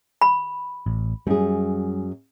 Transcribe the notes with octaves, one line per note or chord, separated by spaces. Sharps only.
B5
A1
F#2 G3 G#4